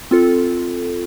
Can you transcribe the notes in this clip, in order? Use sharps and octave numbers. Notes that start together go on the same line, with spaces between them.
C4 F4 A4